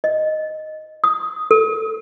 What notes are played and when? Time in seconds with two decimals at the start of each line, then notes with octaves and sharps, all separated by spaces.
0.04 D#5
1.04 D#6
1.51 A4